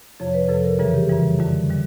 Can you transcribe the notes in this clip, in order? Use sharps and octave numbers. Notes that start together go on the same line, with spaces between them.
F2 C3 F3 C#5
B4
F2 C3 F3 A4
A#4
F#2 C#3 E3 G3 G#4
G4
F#2 C#3 E3 G3
F2 D3 G3
D3 G3